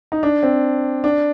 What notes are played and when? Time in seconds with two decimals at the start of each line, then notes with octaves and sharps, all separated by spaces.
0.12 D#4
0.23 D4
0.43 C4
1.04 D4